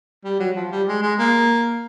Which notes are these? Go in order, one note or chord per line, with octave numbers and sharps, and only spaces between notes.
G3
F#3
F3
G3
G#3
G#3
A#3